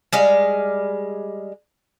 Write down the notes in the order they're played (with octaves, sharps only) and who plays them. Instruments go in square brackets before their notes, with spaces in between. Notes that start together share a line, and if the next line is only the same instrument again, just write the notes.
[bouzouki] G3 G#3 F5